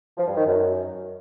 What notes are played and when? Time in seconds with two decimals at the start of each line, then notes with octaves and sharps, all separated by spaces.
0.18 F3
0.27 G2
0.37 D#3
0.46 F#2